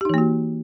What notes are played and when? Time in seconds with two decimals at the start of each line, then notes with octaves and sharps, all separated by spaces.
0.01 G4
0.05 D#4
0.09 E3
0.14 A#3
0.18 F#4